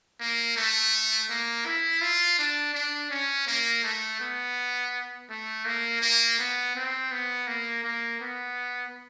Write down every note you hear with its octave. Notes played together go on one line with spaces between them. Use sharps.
A#3
A3
A#3
E4
F4
D4
D4
C#4
A#3
A3
B3
A3
A#3
A#3
B3
C4
B3
A#3
A#3
B3